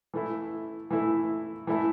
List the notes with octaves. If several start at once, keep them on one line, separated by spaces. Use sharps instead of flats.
E3 A3 E4
E3 A3 E4
E3 A3 E4 A4